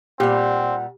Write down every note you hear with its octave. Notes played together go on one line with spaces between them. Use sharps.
A#2 G3 C4 G4 F#5